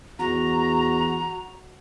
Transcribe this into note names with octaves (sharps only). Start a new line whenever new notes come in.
E2 F#4 A#5